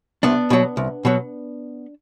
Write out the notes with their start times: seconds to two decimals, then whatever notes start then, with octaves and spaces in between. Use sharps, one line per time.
0.23 C2 B3 D4
0.50 B2 F#3
0.77 C2
1.05 B2 F#3